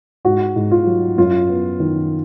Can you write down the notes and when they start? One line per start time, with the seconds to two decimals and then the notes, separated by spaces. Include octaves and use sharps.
0.25 G#2 F#4
0.56 G#2
0.71 F4
0.87 F#3
1.18 F#2 F4
1.49 B3
1.80 D#3